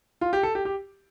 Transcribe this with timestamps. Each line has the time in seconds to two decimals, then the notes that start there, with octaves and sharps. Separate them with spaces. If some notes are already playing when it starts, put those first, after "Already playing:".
0.21 F4
0.33 G4
0.43 A4
0.55 G4
0.65 G4